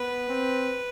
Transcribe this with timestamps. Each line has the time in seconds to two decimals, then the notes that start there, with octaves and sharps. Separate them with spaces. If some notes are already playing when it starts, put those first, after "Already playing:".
Already playing: B3 B4
0.29 C4